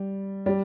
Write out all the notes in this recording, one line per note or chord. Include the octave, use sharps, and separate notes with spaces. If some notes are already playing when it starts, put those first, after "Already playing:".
Already playing: G3
G3